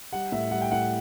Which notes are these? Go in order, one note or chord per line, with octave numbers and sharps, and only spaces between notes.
G3 F#5
A2 E5
G3 F#5
G5
A2 F#5